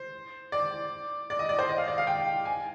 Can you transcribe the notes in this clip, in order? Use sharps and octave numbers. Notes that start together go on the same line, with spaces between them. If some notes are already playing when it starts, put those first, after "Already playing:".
Already playing: C5
D5
D5
D#5
D5
C5
D#5
F5
D5
F5
G5
G#5